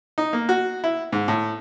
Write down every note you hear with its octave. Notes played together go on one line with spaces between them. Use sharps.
D#4
A#3
F#4
E4
G#2
A2